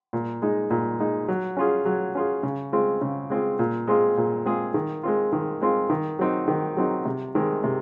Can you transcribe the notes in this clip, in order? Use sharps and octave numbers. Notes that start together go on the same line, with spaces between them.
A#2
G#3 D#4
A#2
G#3 D#4
F#3
C#4 F4 G#4
F#3
C#4 F4 G#4
C#3
G#3 C4 F4 G#4
C#3
G#3 C4 F4 G#4
A#2
G#3 C4 F4 G#4
A#2
G#3 C4 F4 G#4
D#3
G#3 C4 F4
D#3
G#3 C4 F4
D#3
F#3 C4 D#4
D#3
F#3 C4 D#4
C3
D#3 G#3 C4
C3